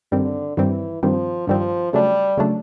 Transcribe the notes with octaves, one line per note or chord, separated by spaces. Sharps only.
G2 D3 D#3 G3 C4
G2 D#3 E3 G3 C4
G2 D#3 F3 G3 C4
G2 D#3 F3 G3 C4
C#3 F#3 G3 A3 D4
C#3 F#3 A3 D4